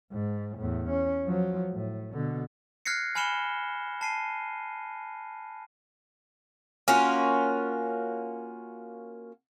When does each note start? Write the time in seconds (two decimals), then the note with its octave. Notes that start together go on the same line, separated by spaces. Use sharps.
0.12 G#2
0.57 E2 A2
0.89 C#4
1.25 F3 F#3
1.72 A2
2.12 B2 D3
2.85 F6 F#6 G#6 A#6 C7 C#7
3.15 G#5 B5 F6 C#7 E7 G7
4.01 A5 C7 D#7
6.88 A#3 C#4 F4 F#4